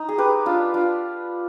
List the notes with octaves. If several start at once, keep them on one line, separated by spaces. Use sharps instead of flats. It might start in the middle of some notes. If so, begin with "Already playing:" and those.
Already playing: D#4
G#4
G4 B4
D4 F4
D4 F4